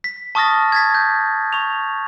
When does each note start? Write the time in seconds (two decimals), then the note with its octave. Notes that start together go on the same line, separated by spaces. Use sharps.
0.04 B6
0.35 A5 C#6 D#6 F6 A6 A#6
0.72 G#6 A6 B6
0.94 G6
1.53 C#6 F7